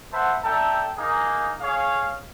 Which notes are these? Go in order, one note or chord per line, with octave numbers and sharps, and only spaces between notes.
B4 C5 E5 F#5 A5
D4 A4 E5 G5 A5 A#5
A#3 D#4 G#4
G#4 C#5 F5